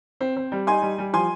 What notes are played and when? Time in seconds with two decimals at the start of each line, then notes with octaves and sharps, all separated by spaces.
0.21 C4
0.37 C4
0.52 G3
0.67 D#4 G#5 C6
0.82 G3
0.98 G3
1.13 F3 G#5 C6